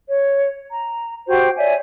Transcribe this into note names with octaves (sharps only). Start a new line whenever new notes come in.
C#5
A#5
F#4 G4 C5 G5
C#5 D5 E5 G#5